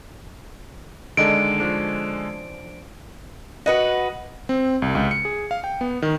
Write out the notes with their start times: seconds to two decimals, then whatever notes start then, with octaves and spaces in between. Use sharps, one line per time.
1.17 D3 D#3 G#3 D4 A4 D7
1.60 F3 C#4 D4
3.66 F#4 B4 D#5 F#5
4.49 C4
4.82 C2
4.95 C#2
5.11 C#7
5.25 G#4
5.51 F5
5.64 G5
5.81 B3
6.02 D#3